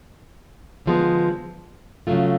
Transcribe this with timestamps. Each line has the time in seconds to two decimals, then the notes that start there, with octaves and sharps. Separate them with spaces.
0.86 D3 F3 G#3 B3
2.07 C#3 F#3 A3 F4